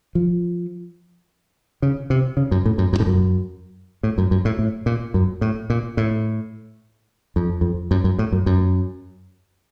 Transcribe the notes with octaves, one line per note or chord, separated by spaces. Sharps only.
F3
C#3
C3
C#3
F#2
A2
F#2
F#2
A2
F#2
A2
F#2
F#2
A2
A2
A#2
F#2
A2
A#2
A2
F2
F2
F#2
F#2
A2
F#2
F#2